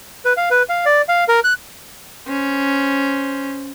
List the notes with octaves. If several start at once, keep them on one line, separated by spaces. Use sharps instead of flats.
B4
F5
B4
F5
D5
F5
A#4
F#6
C#4 C5